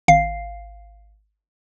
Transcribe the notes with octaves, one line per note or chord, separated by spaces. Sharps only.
G#1 F5 C7